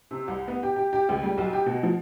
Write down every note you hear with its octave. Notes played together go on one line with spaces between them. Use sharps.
C3
C2
B3
G4
G4
G4
C#2
G3
B1
G4
B2
F3